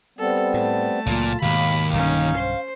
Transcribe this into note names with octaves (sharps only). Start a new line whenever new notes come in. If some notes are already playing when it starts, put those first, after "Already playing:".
G3 B3 C4 A4
A2 A3 A5
C#2 A#2 F#3 F4
D#2 G#2 B2 F5 B5
B1 G2 D3 C#4 D#4 F5
C5